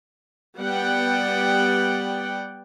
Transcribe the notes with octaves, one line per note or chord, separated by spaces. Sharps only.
G3 B3 D5 F#5 G5